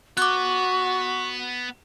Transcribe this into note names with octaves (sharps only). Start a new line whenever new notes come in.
B3 F#4 C#6 D6 F#6